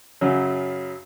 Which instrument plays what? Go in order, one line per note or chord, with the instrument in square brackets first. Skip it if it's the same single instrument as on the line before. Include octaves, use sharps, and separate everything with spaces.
[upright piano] F#2 C#3 F#3